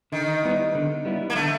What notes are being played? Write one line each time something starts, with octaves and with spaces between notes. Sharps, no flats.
D3 D#3
G3 B3 E4
D3
G3 B3 E4
A#3
D3 A3